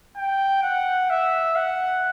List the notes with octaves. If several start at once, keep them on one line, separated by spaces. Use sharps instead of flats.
G5
F#5
E5
F#5